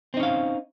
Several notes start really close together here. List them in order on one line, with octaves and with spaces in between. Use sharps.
C4 D#4 C#4 F5